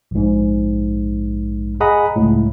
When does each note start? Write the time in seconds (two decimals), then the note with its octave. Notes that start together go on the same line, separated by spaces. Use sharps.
0.11 A#1 G#2
1.80 G#4 D#5 F#5 A#5 B5 D#6
2.16 C#2 A2